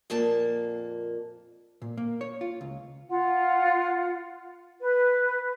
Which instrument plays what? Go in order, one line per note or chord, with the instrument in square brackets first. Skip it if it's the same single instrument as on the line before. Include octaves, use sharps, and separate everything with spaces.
[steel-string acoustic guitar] F2 A#2 A#3 A5
[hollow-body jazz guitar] A#2
A#3
C#5
F4
C#2
[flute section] F4 F#5
B4